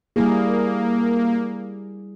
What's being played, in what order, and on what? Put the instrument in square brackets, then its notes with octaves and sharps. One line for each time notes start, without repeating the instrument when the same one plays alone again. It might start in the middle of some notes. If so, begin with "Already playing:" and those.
[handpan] G3 E4 G#4 [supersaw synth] A#3